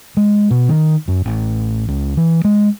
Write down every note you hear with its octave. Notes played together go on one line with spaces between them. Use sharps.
G#3
B2
D#3
F#2
A1
C#2
E3
G#3